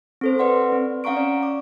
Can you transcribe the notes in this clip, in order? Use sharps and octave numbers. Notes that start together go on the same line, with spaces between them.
C4 A4 C5
B4 D5 F#5 C6
C4
C#4 F5 F#5 A#5 C#6 D7
D5
D6